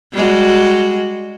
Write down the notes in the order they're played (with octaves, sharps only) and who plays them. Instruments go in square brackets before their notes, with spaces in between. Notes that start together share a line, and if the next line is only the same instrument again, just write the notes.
[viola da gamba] G3 G#3 F#4